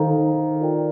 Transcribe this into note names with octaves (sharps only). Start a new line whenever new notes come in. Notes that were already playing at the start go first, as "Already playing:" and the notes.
Already playing: D#3 A4 C5 F5 A#5
F4 A#4 D5 G5